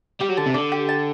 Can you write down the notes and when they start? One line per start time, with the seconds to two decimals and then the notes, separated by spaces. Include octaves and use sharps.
0.21 G3 G4
0.29 F#3
0.37 D3 A5
0.46 C3
0.54 D3 D5
0.72 G4
0.89 A5